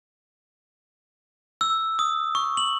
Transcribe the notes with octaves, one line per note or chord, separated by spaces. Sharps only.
E6
D#6
C#6
F#7